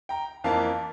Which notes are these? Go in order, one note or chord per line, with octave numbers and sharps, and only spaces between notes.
G5 A#5
F2 E3 A#3 F5 A5